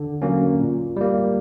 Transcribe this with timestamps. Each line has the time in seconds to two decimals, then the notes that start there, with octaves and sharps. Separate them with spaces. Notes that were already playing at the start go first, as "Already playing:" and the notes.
Already playing: D3
0.22 F#3 A#3 C#4
0.59 A#2
0.96 G3 A#3